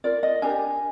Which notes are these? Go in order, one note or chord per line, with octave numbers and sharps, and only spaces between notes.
F4 A#4 D5
D#5
D4 G4 A#4 G#5